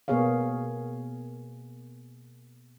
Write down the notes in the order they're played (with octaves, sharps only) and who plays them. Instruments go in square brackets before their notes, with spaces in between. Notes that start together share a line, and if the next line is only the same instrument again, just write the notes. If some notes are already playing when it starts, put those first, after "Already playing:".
[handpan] B2 A#3 B3 G#4 C#5 F5